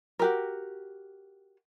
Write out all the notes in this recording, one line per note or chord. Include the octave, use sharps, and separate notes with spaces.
F#4 G4 A#4